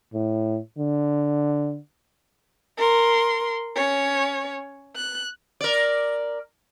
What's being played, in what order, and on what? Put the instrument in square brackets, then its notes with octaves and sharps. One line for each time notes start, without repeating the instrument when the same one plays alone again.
[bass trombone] A2
D3
[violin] A#4 C6
C#4 C#5
F#6
[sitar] A#4 D5